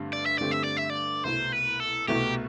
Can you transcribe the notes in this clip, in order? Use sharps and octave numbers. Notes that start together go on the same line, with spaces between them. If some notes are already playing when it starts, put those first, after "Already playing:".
Already playing: G2 D3 A3 C4 G4
D5
E5
G2 D3 A3 C4 G4 D5
E5
D5
E5
D5
C2 B2 A3 E4 C5
B4
A4
C2 B2 A3 E4 G4